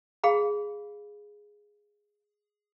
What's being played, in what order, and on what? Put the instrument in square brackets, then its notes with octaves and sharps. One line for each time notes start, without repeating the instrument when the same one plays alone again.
[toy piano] G#4 F5 B5